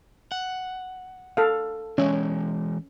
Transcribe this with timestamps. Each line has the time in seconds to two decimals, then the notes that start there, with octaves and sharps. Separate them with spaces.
0.32 F#5
1.37 A4 F5
1.98 E3 G#3 C#4